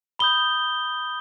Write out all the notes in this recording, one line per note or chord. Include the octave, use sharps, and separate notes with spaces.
B5 D#6 G6 G7